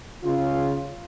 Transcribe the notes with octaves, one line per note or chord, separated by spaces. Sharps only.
C#3 F4